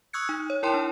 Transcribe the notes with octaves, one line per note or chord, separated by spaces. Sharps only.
C#6 D#6 E6 F#6 G#6 C#7
D#4
C#5
E4 A#4 C#5 G5 A5 C6
D4